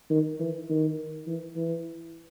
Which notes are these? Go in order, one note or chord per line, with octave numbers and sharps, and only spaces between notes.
D#3
E3
D#3
E3
E3